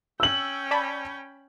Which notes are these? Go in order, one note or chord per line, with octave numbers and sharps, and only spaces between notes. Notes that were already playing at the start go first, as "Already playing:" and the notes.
C#4 G5 E6 F#7
D5 A5 B5